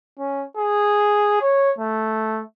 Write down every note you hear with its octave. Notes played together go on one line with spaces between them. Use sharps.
C#4
G#4
C#5
A3